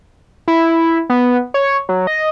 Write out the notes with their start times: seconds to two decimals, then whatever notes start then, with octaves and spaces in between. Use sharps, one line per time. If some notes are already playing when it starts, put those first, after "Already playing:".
0.48 E4
1.10 B3
1.54 C#5
1.89 F#3
2.07 D#5